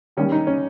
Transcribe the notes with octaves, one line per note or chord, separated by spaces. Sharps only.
D#2 D#3 G3 C#4
D#4
C#4